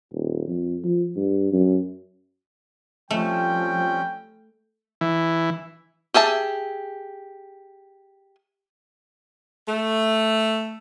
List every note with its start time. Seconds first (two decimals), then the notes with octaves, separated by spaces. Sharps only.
0.12 D#1
0.48 F2
0.84 F3
1.16 G2
1.52 F#2
3.11 F3 G3 A3 C4 C#4 G5
5.01 E3
6.14 G4 G#4 E5 A5
9.67 A3